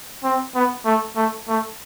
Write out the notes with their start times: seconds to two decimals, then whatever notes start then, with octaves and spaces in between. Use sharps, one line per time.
0.24 C4
0.55 B3
0.85 A3
1.16 A3
1.48 A3